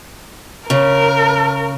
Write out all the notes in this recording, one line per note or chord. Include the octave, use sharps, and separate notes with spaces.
C#3 A#4